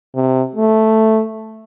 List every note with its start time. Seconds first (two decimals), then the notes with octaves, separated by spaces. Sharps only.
0.15 C3
0.56 A3